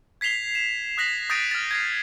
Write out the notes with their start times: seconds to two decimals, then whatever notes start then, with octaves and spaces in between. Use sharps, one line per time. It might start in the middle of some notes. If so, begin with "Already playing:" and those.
0.21 G#6 B6 C7 F7 G7
0.55 E7
0.97 D#6 F#6 A#6 B6 F#7
1.30 D#6 G6 A6 A#6 D7 D#7
1.51 F6 A6
1.71 G#6 A#6 C7